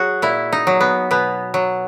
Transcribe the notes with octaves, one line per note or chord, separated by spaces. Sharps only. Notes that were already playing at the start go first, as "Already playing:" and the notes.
Already playing: F#3 F#4 G#4
A#2 E4
D#4
F#3
B3
B2 B3
F#3